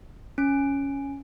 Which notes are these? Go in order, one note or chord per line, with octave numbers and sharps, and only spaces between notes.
C#4 D7